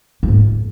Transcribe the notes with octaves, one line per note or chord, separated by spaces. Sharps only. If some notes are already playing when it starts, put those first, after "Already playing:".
G2
G#2